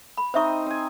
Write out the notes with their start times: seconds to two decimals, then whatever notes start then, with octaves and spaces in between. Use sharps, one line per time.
0.17 B5
0.34 C4 D#4 C5 D#5 E5 C#6
0.66 C4 G#5